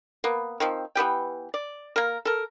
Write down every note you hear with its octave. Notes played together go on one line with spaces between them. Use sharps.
A#3 B3
D#3 F3 C4
E3 B3 G4 G5
D5
A#3 A#4
A4 A#4